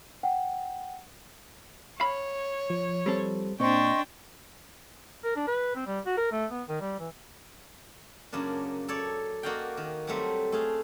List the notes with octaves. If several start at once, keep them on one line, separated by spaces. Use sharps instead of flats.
F#5 G5
C#5 F5 A5 B5
F3
G3 C4 A4
A#2 C4 D4 C5 D#5 G5 C6 C#6
A#4
D4
B4
C4
G3
F#4
A#4
A3
B3
D#3
G3
E3
F#2 C#3 A#3 D4
A4 C#5 D5
A#3 F#4 D5 D#5 F5 G5
D#3
F#3 G3 A3 C4
A3 G#4 F5